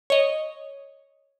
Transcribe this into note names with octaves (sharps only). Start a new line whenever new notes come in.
C#5 D#5